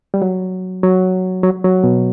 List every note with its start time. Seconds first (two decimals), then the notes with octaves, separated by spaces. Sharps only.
0.14 G3
0.22 F#3
0.83 F#3
1.43 F#3
1.64 F#3
1.84 B2